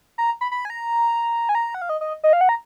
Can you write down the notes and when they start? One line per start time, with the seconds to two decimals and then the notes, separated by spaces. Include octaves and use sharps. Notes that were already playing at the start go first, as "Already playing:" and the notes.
0.18 A#5
0.41 B5
0.52 B5
0.65 G#5
0.70 A#5
1.49 G#5
1.55 A#5
1.74 F#5
1.82 F5
1.89 D#5
2.01 D#5
2.24 D#5
2.33 F5
2.41 F#5
2.49 A#5